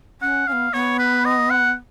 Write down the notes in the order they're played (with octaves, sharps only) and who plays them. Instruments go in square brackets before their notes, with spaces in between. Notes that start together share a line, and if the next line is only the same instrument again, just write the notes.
[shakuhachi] C#4 [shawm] F#5
[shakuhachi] C#4 [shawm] F5
[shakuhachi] B3
[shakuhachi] B3 [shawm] C#5
[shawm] B4
D#5
F#5